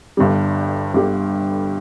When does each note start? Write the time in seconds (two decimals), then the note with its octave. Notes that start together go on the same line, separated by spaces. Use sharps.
0.17 G1 G2 D3 G3
0.93 G1 G2 D3 G3